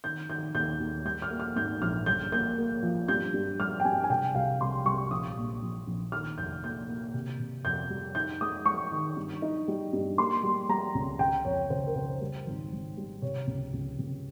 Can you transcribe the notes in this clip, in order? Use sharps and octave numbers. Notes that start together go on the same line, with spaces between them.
D#3 G6
D#3 G6
D#2 G6
D#2
G3 G6
F6
A#3
F6
G#2 G6
A#1 F6
G1 G6
A#3 G6
A#3
F3
G2 G6
G2
G3 F6
G5
G2 G#5
G#5
C3 G5
C2 F5
C2 C6
C2 C#6
A#1 D#6
A#2
A#1
A#1
D#3 F6
F1 G6
A#3 G6
A#3
C3
C3
F2 G6
G3
D#4 G6
G#3 D#6
G#3 C#6
D#3
G2
D#4
G3
G2
A#3 C6
G3
G3 A#5
C#2
C#3 G5
F2 C#5
C#3 C5
A#4
C#3 C5
G3
G#1
G#1
G3
C3 C#5
C#2
C#2
C#2